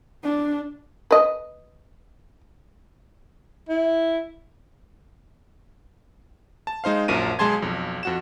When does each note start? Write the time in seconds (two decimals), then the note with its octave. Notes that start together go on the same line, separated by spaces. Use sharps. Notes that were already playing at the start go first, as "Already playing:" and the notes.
0.23 D4
1.11 B4 D#5
3.69 E4
6.67 A5
6.84 G#3 D#4 C5 F5
7.08 A#1 F#2 F3 A#4 D#7
7.39 B1 G#3 G#4 A5 C6 G#6
7.62 B1 F2
8.03 F2 F#4 E7